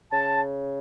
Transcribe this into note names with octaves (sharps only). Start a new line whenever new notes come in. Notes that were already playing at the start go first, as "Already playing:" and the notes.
C#3 A5